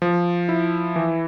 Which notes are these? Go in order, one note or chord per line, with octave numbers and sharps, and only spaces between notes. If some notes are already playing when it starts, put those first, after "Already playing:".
F3
E4
E3